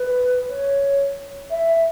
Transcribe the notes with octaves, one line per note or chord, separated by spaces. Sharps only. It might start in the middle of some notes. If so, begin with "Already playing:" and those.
Already playing: B4
C#5
E5